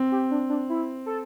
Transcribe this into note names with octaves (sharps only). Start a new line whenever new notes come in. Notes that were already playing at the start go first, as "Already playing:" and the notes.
Already playing: C4
G4
D4
D4
E4
A4